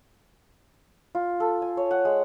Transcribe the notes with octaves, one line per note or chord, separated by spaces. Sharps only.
F4
A4
G#5
C#5
F#5
G#3